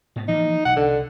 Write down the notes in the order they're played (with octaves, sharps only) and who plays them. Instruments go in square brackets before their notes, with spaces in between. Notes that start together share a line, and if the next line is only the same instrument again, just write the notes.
[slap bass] G#2 B3
[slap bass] E3 F3 A#3 [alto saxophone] D#4
[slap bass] B1 [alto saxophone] F#5
[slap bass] C2 [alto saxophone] D3